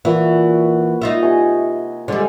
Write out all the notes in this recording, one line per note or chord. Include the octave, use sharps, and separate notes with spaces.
A#2 E3 F#4 B4
D#4 F4 E5
C3 G#5 C#6
D3 G3 G#3 C5